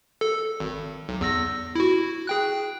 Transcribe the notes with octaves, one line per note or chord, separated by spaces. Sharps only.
A4
G#1
B1
E2 E6 A#6
E4 F#4
G#4 G5 F#6